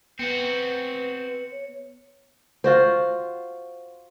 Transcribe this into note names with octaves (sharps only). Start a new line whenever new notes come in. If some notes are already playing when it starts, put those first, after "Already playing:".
B3 C4 F#4 B4 C#7
C#5
F4 F#4 C5